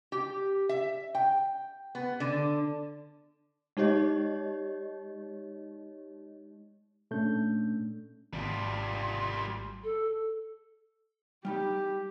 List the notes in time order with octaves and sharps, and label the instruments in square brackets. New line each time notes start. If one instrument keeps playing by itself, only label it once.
[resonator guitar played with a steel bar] G4
E5
G5
B3
D3
[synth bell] G#3 D#4 G4 C#5 D#5
[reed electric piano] A#2 A3 C#4 D4 G6
[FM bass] G#1 [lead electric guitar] G3 F4
[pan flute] A4
[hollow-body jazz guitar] G3 D#4 B5 [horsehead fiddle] G4